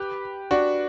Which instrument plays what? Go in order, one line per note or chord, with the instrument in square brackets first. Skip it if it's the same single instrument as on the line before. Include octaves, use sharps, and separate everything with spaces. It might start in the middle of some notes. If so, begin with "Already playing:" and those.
Already playing: [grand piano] G4 B4
D4 F#4